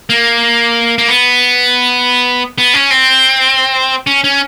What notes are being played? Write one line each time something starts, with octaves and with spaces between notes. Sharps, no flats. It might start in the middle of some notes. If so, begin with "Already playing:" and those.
A#3
A#3
B3
B3
C#4
C4
C#4
C#4